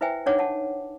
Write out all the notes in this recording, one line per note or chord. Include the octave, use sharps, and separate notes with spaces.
E4 B4 C5 E5 G5 G#5
D4 D#4 C#5 F#5 D6
F#5 A5